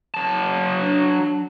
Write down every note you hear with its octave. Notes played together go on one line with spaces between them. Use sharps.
F#3 A5
D4